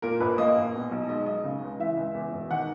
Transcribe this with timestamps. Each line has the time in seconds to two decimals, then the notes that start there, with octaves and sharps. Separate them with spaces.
0.02 A#2 A#4
0.20 A#1 B4
0.38 A#3 D#5
0.56 A#1
0.74 B2
0.91 B1
1.09 G#3 D#5
1.26 B1 D#5
1.44 C#3
1.62 C#2
1.79 E3 E5
1.97 C#2
2.14 E2
2.33 E1
2.51 D#3 F#5